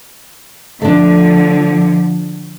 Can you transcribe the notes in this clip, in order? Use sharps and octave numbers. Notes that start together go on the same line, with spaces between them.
D3 F3 A3 D4